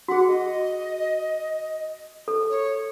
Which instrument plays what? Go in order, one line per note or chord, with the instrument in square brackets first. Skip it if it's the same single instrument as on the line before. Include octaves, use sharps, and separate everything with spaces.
[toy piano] F#4 G#4 [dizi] F#5
[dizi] D#5
[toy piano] A4
[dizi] C#5